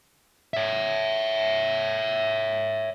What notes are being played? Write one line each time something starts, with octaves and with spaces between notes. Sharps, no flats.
C#5 E5